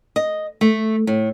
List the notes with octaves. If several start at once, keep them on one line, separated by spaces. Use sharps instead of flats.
D#5
A3
A2